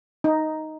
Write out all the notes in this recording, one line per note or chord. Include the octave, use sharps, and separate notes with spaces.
D#4